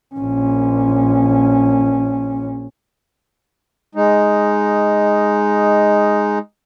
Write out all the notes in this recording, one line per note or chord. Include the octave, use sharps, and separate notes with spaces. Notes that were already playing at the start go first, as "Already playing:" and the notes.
A#1 C#4
G#3 D#4